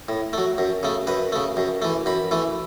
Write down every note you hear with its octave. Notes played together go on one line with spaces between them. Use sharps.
A2
F#3 A3
F#2
C#3 A3
F#2 B4
C#3 A3
F#2
E3 A3
F#2 B5
E3 A3